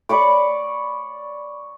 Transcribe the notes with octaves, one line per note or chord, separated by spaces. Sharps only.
D5 B5 C#6 D6